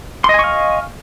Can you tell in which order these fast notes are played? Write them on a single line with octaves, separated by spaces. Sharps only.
C6 D#5 G#5 C#6 F5